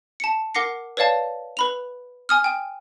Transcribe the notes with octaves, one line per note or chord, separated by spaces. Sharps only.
A5 C#7
A#4 F#5 D6 A#6 C7 C#7
B4 C#5 D5 F5 A5
B4 B5 F7
G#5 D#6 F6
G5 D#7